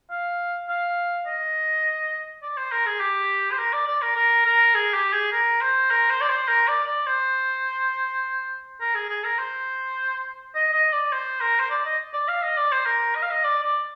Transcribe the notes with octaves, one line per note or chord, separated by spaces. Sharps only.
F5
F5
D#5
D5
C5
A#4
G#4
G4
C5
A#4
D5
D5
A#4
A#4
A#4
G#4
G4
G#4
A#4
C5
A#4
C5
D5
C5
A#4
D5
D5
C5
A#4
G#4
G#4
A#4
C5
D#5
D#5
D5
C5
A#4
C5
D5
D#5
D5
F5
D#5
D5
C5
A#4
D#5
F5
D#5
D5
D5